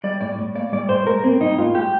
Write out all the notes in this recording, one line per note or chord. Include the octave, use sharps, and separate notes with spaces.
G3 D5
A2 D5
A2
A#3 D5
G3 D5
A2 C5
A2 A#4
A#3 C4
G3 D#4
A2 F4
A2 G4